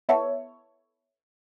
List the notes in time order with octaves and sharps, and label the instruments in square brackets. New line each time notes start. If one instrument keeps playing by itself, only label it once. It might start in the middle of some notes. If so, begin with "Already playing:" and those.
[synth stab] B3 E4 A4 C#5